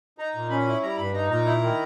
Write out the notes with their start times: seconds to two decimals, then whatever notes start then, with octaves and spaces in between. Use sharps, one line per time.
0.18 D#4 A#5
0.35 A#2
0.50 C#4 B5
0.67 E4
0.83 G3 A#5
0.97 G2 B5
1.13 D#4 A#5
1.30 A#2 A#5
1.45 E4
1.62 D#3